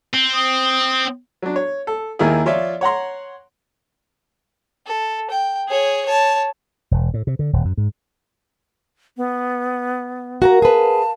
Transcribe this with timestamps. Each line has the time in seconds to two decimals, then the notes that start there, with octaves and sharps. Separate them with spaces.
0.14 C4
0.34 D#6
1.42 F#3 D4
1.56 C#5
1.87 A4
2.19 D#2 D#3 A#3 E4 G#4
2.46 F3 F4 C#5 D5 E5
2.81 C#5 F#5 A#5 C6
4.86 A4
5.31 G5
5.68 G#4 C#5
6.06 C#5 A5
6.91 E1
7.14 A2
7.27 C3
7.39 D3
7.53 D#1
7.65 F#2
7.78 G#2
9.17 B3
10.42 F#4 A#4 F5 A5 A#5
10.62 G#4 B4 A5